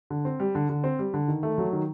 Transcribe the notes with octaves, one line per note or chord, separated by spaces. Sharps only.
D3
C4
G3
D3
D3
C4
G3
D3
D#3
A3
F#3
D#3